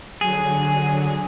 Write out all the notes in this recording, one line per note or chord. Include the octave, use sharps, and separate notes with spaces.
D3 F#3 G#4